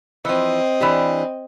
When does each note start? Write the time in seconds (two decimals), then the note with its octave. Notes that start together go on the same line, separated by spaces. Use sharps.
0.25 E3 F3 C4 D#5
0.80 E3 D4 G4